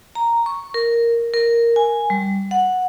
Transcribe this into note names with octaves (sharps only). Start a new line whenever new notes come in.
A#5
C#6
A#4
A#4
G#5
G3
F#5